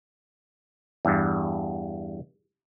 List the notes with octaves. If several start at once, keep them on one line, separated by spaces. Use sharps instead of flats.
E2 G2